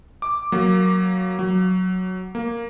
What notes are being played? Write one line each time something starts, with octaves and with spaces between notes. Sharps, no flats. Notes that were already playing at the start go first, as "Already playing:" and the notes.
D6
F#3 A#3
F#3
A#3